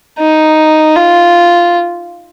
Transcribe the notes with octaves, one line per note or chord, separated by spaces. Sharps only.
D#4
F4